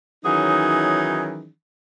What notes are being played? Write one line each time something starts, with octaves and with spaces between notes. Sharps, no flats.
D#3 E3 F#3 C#4 D#4 G#4